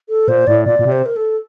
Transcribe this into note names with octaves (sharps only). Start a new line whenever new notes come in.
A4
A#2 C5
A2 D5
A#2 D5
A#2
C3
C5
A#4
A4